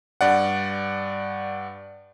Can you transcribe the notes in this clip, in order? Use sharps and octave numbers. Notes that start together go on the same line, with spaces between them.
G2 D5 F#5